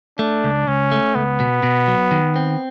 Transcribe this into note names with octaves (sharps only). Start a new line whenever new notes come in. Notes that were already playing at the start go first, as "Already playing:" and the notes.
A3 D4
C#2
C#2 C#4
A3
C#2 B3
B2
B2
F#3
D#3
C4